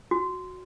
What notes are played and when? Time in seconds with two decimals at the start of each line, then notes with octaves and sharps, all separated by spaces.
0.11 F#4